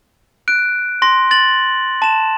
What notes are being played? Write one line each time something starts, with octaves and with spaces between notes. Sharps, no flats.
F#6 D7
C6 A#6
A6 F#7
A5 E7